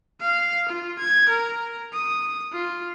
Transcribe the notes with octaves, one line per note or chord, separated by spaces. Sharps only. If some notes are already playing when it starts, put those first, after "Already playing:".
F5
F4
G#6
A#4
D#6
F4